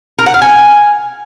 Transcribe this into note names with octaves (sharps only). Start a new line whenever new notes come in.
A#4
F#5
F5
G#5